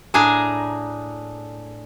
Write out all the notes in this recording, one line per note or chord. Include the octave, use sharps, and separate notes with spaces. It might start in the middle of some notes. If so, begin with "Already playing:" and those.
A2 D4 G#4 G#5 A#5